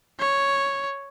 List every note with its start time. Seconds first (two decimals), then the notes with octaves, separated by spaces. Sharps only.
0.19 C#5